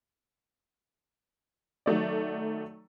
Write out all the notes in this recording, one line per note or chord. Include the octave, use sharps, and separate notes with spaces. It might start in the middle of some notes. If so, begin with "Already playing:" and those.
D#3 F#3 A3 D5